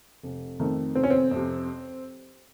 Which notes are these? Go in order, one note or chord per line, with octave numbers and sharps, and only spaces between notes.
F1
F2 D#3 A3
F1 C4
C#4
C4
F2 C3